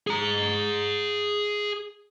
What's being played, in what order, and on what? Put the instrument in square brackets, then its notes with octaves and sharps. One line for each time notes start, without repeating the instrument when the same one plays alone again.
[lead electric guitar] G#4 A#5